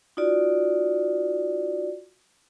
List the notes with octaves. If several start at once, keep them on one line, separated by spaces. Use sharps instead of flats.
D#4 F4 F#4 D5